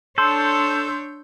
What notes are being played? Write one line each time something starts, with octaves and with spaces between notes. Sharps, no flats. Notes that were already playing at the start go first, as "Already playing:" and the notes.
D4 A4 C#5 C6 E6 G6